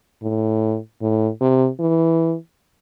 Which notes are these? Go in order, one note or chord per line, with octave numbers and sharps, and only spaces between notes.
A2
A2
C3
E3